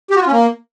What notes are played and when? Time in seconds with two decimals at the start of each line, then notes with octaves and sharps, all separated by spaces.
0.10 G4
0.16 F#4
0.21 F4
0.27 C#4
0.32 A#3